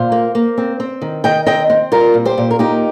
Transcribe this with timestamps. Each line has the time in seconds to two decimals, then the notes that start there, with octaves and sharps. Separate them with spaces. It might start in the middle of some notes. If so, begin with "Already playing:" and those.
Already playing: A#2 C5 F5
0.12 A#3
0.35 A#3
0.58 C4
0.80 C4
1.02 D#3
1.24 D#3 D#5 G5
1.46 C4 D#5 G5
1.70 C4
1.92 G3 F4 A#4
2.14 A#2
2.25 G4 C5
2.38 A#2
2.51 A#4
2.59 A#3 D#4 G4